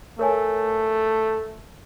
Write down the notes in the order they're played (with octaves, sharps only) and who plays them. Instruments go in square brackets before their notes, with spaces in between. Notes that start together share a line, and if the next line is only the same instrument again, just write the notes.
[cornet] A3 [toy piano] A#4 C#5 G#5